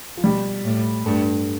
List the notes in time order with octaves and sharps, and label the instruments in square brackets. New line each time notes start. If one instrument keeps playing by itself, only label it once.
[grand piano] F3
[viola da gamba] B2 [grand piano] G3
[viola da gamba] A2
[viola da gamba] G2 [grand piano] A3